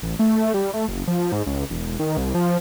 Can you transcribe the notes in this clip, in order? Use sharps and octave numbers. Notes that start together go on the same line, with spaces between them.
A1
A3
G3
A3
F#1
F3
G#2
C#2
E1
D#3
C2
F3